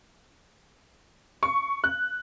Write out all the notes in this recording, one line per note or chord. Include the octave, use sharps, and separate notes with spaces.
C#6
F#6